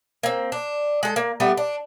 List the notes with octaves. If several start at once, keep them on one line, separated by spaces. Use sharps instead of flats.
A#3 C4
D4
G#3 A4
A#3
G3 A3 B3
D4